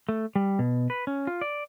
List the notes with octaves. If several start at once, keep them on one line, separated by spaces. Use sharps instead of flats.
A3
G3
B2
B4
C#4
F4
D5